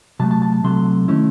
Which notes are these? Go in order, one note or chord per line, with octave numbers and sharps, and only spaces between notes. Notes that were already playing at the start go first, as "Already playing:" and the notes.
C3 F#3 A3 A5
A5
A5
A5
C2 C3 F#3 A3 C6
D#3 A3 C#4 E4